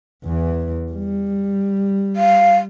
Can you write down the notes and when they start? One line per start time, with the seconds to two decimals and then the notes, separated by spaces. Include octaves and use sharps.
0.24 E2 E3
0.92 G3
2.16 F5